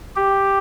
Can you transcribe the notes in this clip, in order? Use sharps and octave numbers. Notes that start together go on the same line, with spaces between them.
G4